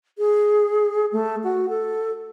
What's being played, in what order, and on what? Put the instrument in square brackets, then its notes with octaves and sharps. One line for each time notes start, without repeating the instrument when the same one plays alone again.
[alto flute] G#4
A3
F#4
A4